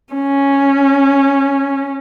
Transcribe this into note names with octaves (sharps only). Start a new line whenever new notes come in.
C#4